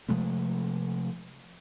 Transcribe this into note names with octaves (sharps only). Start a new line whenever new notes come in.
C3 F3 G#3 A3